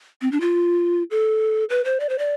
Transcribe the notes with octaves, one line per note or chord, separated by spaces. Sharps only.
C4
D4
F4
A4
B4
C5
D5
C5
D5